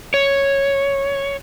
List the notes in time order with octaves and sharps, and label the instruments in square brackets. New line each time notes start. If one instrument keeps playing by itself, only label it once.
[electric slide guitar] C#5